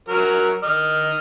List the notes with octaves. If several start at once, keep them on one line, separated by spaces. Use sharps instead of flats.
F#3 A#4
D#5 F6